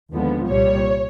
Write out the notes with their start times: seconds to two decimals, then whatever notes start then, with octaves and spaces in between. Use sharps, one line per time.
0.11 D#2 D3 F3 G#3 B3
0.47 C2 A#2 G3 C#5